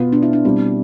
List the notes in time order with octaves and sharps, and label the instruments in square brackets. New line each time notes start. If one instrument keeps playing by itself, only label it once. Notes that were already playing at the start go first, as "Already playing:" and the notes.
Already playing: [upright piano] B2 B3 F4
[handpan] D4
E4
D4
[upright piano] B2 G3 D4 [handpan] C4